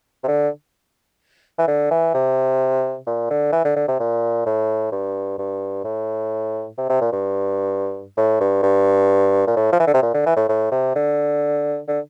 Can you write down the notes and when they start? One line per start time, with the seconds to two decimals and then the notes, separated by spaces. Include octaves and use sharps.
0.23 C3
0.28 D3
1.58 E3
1.68 D3
1.91 E3
2.14 C3
3.07 A#2
3.30 D3
3.52 E3
3.65 D3
3.76 D3
3.88 C3
3.99 A#2
4.46 A2
4.92 G2
5.38 G2
5.84 A2
6.78 C3
6.89 C3
7.01 A#2
7.12 G2
8.17 A2
8.40 G2
8.63 G2
9.47 A#2
9.56 A2
9.72 F3
9.80 E3
9.87 D3
9.94 C3
10.02 A#2
10.14 D3
10.26 E3
10.37 A2
10.49 A2
10.72 C3
10.95 D3
11.88 D3